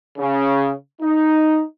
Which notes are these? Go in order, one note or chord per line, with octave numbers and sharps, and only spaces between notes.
C#3
D#4